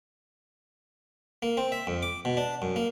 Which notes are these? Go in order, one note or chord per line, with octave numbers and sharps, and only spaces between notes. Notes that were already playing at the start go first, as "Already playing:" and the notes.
A#3
C4
E5
F2
D6
B2
D4
F#2
A#3